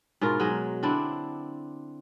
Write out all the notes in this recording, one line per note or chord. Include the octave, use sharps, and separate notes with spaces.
G#2 B2 F4 A#4
F#3 G#3 D#5
D3 C4 D4 E4